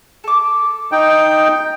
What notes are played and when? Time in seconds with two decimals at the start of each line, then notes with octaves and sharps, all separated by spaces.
0.24 A4 D6
0.92 D#4 G5